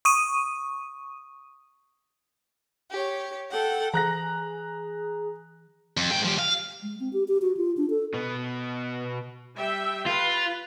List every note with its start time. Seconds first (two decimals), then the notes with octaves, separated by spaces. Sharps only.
0.05 C#6 D#6 D#7
2.91 G4 C#5
3.50 A4 F#5 G5
3.94 E3 G#4 A#5 F#6 A#6
5.97 F2
6.11 G#2 G5
6.25 F3 G4
6.39 F5
6.83 G#3
7.00 C4
7.13 G4
7.28 G4
7.42 F#4
7.57 F4
7.77 D4
7.90 A4
8.14 B2 B3
9.57 G3 E5 G5
10.06 F4 B4